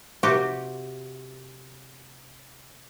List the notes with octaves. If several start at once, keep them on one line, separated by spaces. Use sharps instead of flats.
C3 F#4 G4